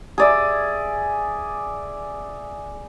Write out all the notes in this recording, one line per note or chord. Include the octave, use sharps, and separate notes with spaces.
G#4 D5 E5